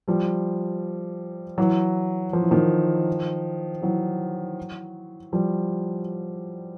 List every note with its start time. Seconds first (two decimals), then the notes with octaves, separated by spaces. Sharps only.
0.08 F3 G3
1.58 E3 F#3
2.33 F3
2.42 E3
2.51 D#3 F3
3.82 E3 F#3
5.32 F3 G3